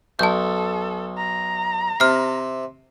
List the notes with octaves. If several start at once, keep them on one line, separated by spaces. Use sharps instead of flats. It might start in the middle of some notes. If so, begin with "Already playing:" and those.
B1 A4 A5 G6
A#5
C3 F6 C7